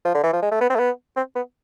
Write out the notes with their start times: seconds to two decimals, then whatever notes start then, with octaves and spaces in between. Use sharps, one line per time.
0.05 F3
0.14 D3
0.23 E3
0.33 F3
0.42 G#3
0.51 A3
0.61 B3
0.70 C4
0.75 A3
0.79 B3
1.16 C4
1.35 B3